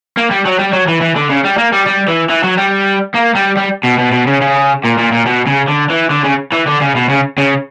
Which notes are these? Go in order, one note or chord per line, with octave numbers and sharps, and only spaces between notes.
A#3
G3
F#3
G3
F#3
E3
E3
D3
C#3
G3
A#3
G3
G3
E3
E3
F#3
G3
A#3
G3
G3
B2
B2
B2
C#3
C#3
A#2
A#2
A#2
B2
C#3
D3
E3
D3
C#3
E3
D3
C#3
B2
C#3
C#3